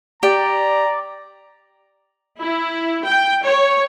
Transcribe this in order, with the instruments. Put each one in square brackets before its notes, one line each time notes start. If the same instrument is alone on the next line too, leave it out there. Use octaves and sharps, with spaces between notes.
[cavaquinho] G4 [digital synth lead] D5 [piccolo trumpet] A#5
[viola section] E4
G5
C#5